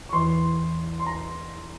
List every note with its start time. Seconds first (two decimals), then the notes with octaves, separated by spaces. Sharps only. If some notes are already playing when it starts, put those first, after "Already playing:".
0.09 C#6
0.13 E2 E3 C6
1.00 C6
1.06 A#5